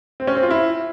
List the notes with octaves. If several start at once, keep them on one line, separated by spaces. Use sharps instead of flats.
C4
C#4
C4
F4
E4